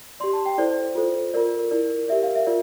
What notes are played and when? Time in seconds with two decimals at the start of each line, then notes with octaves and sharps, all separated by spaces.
0.20 G4 D5 C6
0.33 A5
0.46 G5
0.58 E4 A4 C5 D5
0.95 F4 A4 C5
1.34 F4 A#4 D5
1.71 E4 A#4 D5
2.08 G4 A#4 D5 E5
2.23 F5
2.35 E5
2.46 F4 A#4 D5